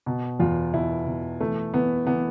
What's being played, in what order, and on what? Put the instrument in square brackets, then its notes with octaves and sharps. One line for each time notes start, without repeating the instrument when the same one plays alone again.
[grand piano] B2
E2 F4
B2 E4
B2
E3 A3
E3 B3
E3 B3